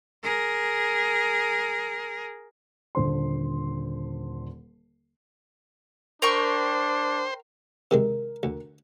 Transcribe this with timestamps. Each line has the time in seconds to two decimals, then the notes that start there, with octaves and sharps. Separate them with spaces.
0.23 G#4 A#4
2.95 D#1 D3 C5 C6
6.22 D4 A#4 C5 G5 C#6
7.91 C3 D#3 G#3 A#4
8.43 D2